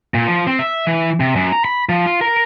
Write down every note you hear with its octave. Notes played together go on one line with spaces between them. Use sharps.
A#2
F3
C4
E5
E3
C3
F#2
A#5
B5
F3
F4
A#4